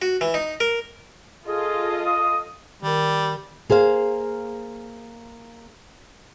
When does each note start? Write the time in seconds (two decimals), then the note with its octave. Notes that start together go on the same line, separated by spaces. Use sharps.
0.02 F#4
0.21 E3
0.34 D#4
0.60 A#4
1.47 F4 G#4 A4 D#5
2.06 D#6
2.83 D#3 G3 A#4
3.70 A#3 G#4 C5 F5